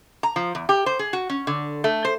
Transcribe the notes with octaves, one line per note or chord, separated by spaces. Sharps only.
A#5
F3
E2
G4
C5
G#4
F#4
C#4
D3
A3
C5